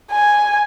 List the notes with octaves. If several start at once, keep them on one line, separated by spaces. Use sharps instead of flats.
G#5